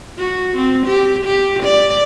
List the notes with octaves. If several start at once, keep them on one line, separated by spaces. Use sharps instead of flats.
F#4
C4
G4
G4
D5